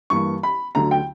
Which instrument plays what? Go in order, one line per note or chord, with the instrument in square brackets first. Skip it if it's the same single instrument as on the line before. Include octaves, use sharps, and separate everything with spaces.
[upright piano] G2 E3 A#3 C#6
B5
D2 D3 F#3 A#5
G5